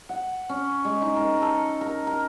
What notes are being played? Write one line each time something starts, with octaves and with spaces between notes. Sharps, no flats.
F#5
C#4
G#3
D#4
A#4
A4
A#4
A#4